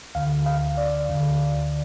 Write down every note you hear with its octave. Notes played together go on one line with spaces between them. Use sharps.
D2 D3 F5
F5
D5
D2 D3